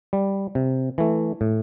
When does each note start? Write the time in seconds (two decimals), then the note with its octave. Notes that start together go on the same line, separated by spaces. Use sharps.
0.13 G3
0.55 C3
0.98 E3 A3
1.41 A2